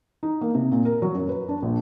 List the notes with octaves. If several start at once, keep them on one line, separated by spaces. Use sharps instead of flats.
D#4
A#3
C3
A#2
A#4
F#3
F#2
B4
D4
A#1